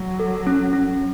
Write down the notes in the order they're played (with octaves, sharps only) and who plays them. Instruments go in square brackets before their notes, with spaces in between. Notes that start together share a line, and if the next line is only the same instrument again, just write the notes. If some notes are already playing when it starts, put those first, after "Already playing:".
Already playing: [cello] F#3
[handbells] A4
C#4
C#4